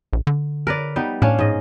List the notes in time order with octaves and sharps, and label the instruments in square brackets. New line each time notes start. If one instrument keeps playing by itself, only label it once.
[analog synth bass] A#1
D3
[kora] A#4 B4 D5
G3 B3 D#4
[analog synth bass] A2 [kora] C#4 D4 F5
[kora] G#2 D#5